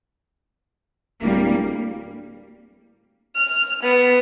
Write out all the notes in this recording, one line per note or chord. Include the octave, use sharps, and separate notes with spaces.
D1 G3 A#3
F6
B3